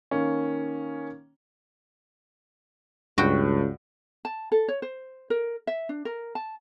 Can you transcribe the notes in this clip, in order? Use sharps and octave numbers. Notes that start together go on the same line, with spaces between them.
D#3 A#3 C#4
C#2 G2 F#4 G5
A5
A4
C#5
C5
A#4
E5
D4
A#4
A5